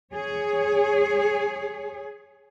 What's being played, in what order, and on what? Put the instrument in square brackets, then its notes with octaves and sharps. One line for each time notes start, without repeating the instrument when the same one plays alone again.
[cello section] G#4 C#5